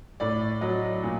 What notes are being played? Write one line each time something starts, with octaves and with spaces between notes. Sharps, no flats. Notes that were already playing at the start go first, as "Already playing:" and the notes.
A2 D5
F#3 D#5
A#2